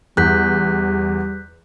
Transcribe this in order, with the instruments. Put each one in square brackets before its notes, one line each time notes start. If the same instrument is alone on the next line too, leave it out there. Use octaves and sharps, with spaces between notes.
[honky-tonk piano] E2 [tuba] G3 [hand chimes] F#6 G6 B6